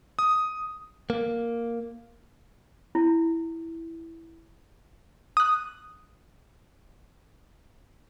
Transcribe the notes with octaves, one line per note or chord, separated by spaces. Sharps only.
D#6
A#3
E4
D#6 F#6